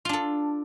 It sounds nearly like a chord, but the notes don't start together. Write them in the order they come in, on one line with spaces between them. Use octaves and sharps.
F4 D4 A4